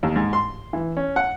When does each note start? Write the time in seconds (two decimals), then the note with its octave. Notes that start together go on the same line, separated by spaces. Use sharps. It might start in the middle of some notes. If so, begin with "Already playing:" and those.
0.03 D#2
0.16 G#2
0.33 C6
0.73 E3
0.97 C#4
1.16 F#5